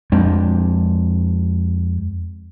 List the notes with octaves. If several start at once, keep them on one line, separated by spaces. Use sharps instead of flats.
F2 G#3 C4 D4